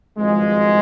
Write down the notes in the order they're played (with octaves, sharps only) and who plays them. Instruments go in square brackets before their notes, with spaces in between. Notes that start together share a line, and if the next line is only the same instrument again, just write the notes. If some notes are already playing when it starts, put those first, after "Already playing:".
[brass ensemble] G#1 G2 F3 G#3